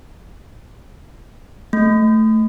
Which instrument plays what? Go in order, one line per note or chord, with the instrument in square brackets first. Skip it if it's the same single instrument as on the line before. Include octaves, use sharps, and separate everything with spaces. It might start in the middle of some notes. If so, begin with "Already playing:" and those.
[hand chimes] A3